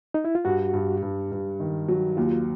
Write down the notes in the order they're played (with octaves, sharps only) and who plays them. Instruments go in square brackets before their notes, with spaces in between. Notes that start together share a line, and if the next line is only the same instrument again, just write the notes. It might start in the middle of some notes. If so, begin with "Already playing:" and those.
[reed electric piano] D#4
E4
F4
[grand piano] G2 [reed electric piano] F#4
[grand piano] G2
G2
G2
D#3
F#3
[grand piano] D#2 [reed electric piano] F4